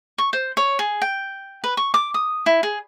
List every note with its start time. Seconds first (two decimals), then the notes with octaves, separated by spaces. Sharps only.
0.18 C#6
0.33 C5
0.57 C#5
0.79 G#4
1.02 G5
1.64 B4
1.77 C#6
1.94 D6
2.14 D#6
2.46 E4
2.63 G#4